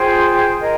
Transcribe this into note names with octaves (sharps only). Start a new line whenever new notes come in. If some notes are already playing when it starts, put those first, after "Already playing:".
Already playing: F4 G#4 C5 G5
A#4 D#5